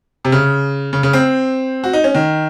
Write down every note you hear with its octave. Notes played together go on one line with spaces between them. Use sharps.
C3
C#3
C#3
C#3
C4
F#4
D#4
C#4
D#3